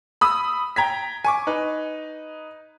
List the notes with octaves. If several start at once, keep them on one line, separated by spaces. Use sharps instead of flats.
B5 D#6 E6
G5 A#5 G#6 B6
G#5 C#6 D6
D#4 B4